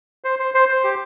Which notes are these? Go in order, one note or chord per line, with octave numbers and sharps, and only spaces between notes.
C5
C5
C5
C5
G4